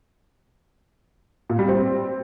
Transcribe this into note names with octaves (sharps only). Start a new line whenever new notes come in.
A#2
G3
C4